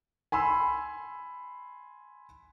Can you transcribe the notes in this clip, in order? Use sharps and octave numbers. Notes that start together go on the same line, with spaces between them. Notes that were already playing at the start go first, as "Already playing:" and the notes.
G#5 B5 C6 E6